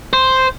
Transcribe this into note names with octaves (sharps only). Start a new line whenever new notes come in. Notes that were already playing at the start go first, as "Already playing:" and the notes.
C5